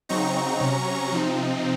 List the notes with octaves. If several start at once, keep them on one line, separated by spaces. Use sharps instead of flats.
C#3 F#3 C4 D#4 A#5 C#6
C3 F#3 C#4
C3 F3 C4 D#4